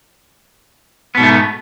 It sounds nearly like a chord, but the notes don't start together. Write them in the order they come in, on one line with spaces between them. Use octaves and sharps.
B3 B2 G#2 A3